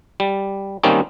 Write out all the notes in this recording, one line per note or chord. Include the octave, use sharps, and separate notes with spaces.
G3
D#3 G3 A#3 C4 C#4 D#4